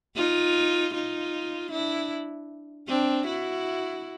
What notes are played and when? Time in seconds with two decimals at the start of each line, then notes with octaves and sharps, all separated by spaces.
0.16 D#4 F4
0.94 D#4 F4
1.71 D4 E4
2.88 C4 D4
3.27 E4 F#4